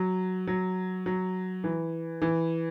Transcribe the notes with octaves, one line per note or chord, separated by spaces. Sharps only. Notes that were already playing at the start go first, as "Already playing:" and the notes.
Already playing: F#3
F#3
F#3
E3
E3